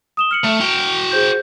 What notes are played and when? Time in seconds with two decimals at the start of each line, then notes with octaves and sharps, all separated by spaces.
0.17 D#6 E7 G7
0.31 F6 C#7 F#7
0.44 A3
0.61 F#4 G5
1.11 G#4 C5 G6